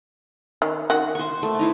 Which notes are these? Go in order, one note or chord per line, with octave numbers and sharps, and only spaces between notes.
D#3
D#3 F#4
C5 C#6
A3
D#4 E4 B4